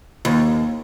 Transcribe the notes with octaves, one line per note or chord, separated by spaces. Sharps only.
D#2